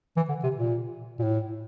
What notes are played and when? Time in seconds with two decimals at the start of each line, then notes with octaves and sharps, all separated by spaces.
0.17 E3
0.29 D3
0.43 C3
0.56 A#2
1.19 A#2
1.23 A2